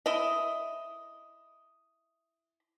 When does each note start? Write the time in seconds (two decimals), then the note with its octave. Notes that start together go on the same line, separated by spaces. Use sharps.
0.06 E4 D#5